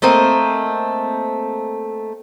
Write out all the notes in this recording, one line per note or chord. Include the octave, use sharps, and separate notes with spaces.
A3 A#3 C4 D#5